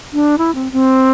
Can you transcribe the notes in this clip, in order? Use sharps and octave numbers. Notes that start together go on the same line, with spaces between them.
D4
E4
C4
C4